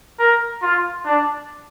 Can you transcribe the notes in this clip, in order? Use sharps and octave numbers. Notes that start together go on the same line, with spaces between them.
A#4
F4
D4